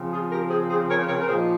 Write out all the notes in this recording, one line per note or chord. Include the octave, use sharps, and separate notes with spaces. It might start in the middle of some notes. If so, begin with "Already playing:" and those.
Already playing: C#3 F3 C4
F4 G#4
G4 A#4
G#4 C5
G#4 C5
A#4 C#5
A#4 C#5
A#4
A#2 F3 A#3 D#4 G#4 C5